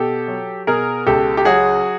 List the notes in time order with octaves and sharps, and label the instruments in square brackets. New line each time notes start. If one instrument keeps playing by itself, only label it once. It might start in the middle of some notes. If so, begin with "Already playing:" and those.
Already playing: [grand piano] B2 G4 A4
F#3
B2 G#4 A#4
C#2 G4 A4
G4
F#3 F#4 G#4